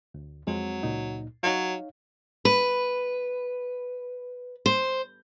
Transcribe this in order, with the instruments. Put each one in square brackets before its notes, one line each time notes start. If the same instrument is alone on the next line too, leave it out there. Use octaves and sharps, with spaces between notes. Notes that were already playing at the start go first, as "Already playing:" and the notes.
[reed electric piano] D2
[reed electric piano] F2 G#3 C4 [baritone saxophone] F#3
[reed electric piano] C#2 A#2 D#4
[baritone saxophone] F#3 [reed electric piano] D#4 C#5 F5
[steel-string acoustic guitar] B4
C5